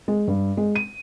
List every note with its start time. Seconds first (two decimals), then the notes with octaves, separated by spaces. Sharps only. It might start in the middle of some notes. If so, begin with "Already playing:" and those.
0.08 G#3
0.28 G2
0.57 G#3
0.75 D#7